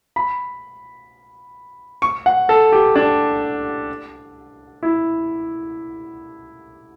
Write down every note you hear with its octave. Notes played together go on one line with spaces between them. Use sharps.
B5
C#6
F#5
A4
G4
D4
E4